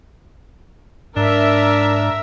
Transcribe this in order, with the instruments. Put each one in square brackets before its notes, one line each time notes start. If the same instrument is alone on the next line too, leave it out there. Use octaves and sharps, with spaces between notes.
[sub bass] G#2 [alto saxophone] D4 [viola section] A#4 E5